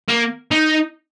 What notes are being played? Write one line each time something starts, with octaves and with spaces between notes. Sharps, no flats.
A#3
D#4